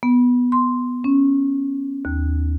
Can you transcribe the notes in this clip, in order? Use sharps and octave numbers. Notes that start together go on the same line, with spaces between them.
B3
C6
C#4
D#2